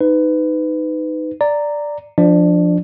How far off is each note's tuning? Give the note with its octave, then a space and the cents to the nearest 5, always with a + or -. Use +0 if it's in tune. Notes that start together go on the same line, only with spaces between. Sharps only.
D#4 +0 B4 +25
D5 +0 A#5 -10
F3 +0 D4 +0 D5 +25